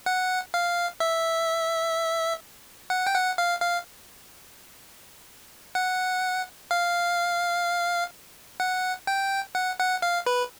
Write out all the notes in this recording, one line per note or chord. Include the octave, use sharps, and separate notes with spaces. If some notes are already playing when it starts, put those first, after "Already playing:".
F#5
F5
E5
F#5
G5
F#5
F5
F5
F#5
F5
F#5
G5
F#5
F#5
F5
B4